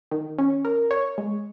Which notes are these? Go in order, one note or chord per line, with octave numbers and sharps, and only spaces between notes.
D#3
C#4
A#4
C#5
G#3